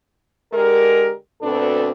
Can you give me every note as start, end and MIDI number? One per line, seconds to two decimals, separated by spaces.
0.53 1.12 50
0.53 1.12 56
0.53 1.12 67
0.53 1.12 70
1.41 1.91 38
1.41 1.91 47
1.41 1.91 60
1.41 1.91 62
1.41 1.91 69
1.41 1.91 71